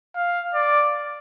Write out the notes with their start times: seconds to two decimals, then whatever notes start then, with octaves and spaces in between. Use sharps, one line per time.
0.16 F5
0.54 D5